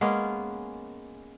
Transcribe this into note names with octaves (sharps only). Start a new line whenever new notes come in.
G#3 A#3 B3 C#4